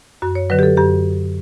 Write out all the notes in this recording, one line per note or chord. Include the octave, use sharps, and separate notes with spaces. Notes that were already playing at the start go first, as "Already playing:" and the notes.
F#2 F#4
C#5
D3 F#3 B4
G4
A4
F#2 G4